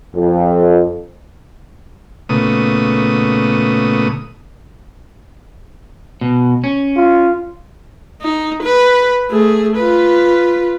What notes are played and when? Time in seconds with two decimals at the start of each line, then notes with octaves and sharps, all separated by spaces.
0.15 F2
2.29 A#2 C#3 A3 B3 D#6
6.21 B2
6.64 C#4
6.96 F4
8.22 D#4
8.63 B4
9.30 A3 G#4
9.76 F4 B4